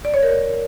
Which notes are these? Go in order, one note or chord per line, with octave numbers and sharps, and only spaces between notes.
D5
C#5
A#4